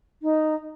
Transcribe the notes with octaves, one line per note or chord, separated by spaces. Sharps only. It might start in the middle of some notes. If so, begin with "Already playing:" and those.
D#4